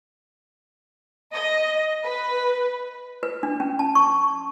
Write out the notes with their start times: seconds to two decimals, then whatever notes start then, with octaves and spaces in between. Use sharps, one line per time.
1.33 D#5
2.03 B4
3.23 B4
3.43 D4
3.60 C#4
3.79 A5
3.95 C#6